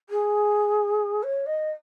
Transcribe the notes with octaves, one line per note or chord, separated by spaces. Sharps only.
G#4
C#5
D#5